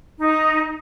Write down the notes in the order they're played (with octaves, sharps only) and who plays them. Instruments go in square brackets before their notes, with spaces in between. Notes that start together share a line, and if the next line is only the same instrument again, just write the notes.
[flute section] D#4